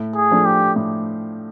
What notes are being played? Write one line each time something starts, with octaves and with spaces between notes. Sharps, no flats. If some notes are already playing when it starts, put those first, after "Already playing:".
Already playing: A2
G#4
F3 A3 D4
G4
A2